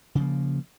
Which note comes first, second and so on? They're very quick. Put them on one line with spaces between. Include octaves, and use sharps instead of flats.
C#3 F3 A#3